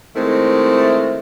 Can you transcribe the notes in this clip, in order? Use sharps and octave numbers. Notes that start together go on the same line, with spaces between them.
D#3 G#3 A3 C4 E4